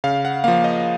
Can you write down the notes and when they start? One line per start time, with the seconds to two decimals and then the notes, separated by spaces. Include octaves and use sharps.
0.04 C#3 F5
0.25 F#5
0.44 F3 A#3 F5
0.64 D#5